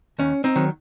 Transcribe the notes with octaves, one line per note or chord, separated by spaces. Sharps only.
D#2 C#4
C4 D#4
D#3 F#3